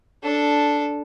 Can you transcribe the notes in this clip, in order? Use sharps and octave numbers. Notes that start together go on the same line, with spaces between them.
D4 A4